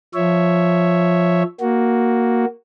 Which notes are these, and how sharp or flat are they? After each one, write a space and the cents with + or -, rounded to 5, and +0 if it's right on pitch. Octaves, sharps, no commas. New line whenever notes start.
F3 +0 C#5 +0 E5 +0
A#3 +0 F#4 +0